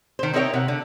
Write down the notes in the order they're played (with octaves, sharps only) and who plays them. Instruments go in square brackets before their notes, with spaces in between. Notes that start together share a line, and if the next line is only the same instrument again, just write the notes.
[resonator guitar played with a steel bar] D#3 C5
C4 D#4 E4 A#4 C#5 G5
C3 F#5
D3